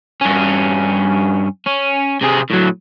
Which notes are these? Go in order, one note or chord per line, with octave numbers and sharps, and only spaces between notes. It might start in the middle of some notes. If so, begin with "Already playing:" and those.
G2 C#4
C#4
C3 G#4
A2 F#3